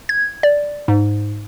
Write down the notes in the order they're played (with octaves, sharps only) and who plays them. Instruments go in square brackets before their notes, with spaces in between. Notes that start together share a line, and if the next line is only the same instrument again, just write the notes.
[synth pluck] G#6
D5
G#2